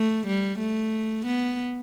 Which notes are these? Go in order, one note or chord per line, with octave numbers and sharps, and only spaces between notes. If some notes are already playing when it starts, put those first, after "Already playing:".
Already playing: A3
G3
A3
B3